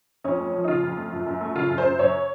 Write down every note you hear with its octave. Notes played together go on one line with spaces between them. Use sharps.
F2 C#4
A3
F3
D#4
C#3 F4
F2
A3
F#2
F#2
A3
C#3 F4
F#2
C5
F#2
F#2 C#5